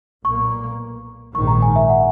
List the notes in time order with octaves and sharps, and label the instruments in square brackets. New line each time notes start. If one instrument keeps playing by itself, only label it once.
[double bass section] B1 A#2 A#3 [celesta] C#6
[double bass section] A#1 G#2 D#3 [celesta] C#6
[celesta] A#5
G#5
E5
F#5